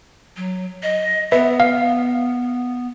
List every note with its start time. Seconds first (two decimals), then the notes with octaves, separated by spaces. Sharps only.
0.36 F#3
0.83 D#5
1.32 B3 B4 E5
1.60 F5